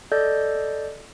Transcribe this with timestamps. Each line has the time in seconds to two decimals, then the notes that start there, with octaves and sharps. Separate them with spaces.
0.12 A4 D5 D#5 G6